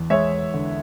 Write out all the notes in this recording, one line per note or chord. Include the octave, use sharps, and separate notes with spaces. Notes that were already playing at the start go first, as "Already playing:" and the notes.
Already playing: E2
G#3 C#5 E5
D3